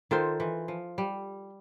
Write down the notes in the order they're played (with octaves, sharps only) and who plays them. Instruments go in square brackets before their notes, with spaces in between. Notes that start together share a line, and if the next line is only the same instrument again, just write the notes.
[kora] D#3 [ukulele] F4 A4 C5
[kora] E3
F3
G3